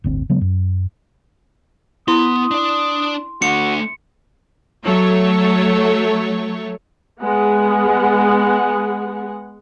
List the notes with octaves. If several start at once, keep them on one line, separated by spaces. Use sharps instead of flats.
D1 G1 C4
C#3 F#3 G#3 B3
F#2
B3 E4 C6 D#6
D4 D5
A3 D4 F#4 C#7
F#3 A3 C#5
G#3 B3 G#4 F#5